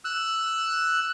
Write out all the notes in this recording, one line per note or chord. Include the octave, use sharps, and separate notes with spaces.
E6 F#6